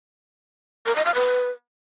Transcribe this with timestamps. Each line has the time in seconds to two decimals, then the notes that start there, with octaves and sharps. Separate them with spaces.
0.86 A#4
0.96 D#5
1.05 F5
1.15 B4